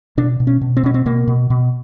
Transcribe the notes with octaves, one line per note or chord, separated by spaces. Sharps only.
B2 D4
B2
C#4
B2
C4
B2 C#4
C4
B2 A#3
B2
B2